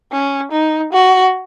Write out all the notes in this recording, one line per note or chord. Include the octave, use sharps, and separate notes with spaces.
C#4
D#4
F#4